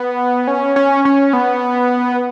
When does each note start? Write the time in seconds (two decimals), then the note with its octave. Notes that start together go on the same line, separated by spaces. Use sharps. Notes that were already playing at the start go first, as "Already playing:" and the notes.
Already playing: B3
0.47 C#4
0.76 C#4
1.05 C#4
1.33 B3